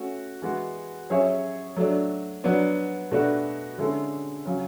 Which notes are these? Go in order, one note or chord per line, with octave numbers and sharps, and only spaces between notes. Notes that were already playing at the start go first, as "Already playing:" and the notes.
Already playing: A3 C#4 F#4
E3 G#3 B3 F#4
F#3 C#4 G#4 C#5 E5
F#3 A3 D4
F#3 B3 D4
B2 A3 D4 F#4 B4
D3 G#3 C#4 E4 A4
C#3 F#3 C#4